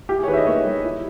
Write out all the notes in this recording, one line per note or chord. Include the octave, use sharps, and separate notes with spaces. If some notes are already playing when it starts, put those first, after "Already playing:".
E4 G4
G#4
C#5
D#3 B4
E5
D#5
A#3 C#5
G3
E4